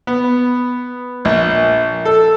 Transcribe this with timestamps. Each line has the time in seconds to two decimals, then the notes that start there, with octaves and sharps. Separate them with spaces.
0.07 B3
1.25 A#1
2.05 A4